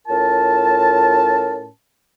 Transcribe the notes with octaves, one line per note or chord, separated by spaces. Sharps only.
A2 C#4 F4 A#4 A5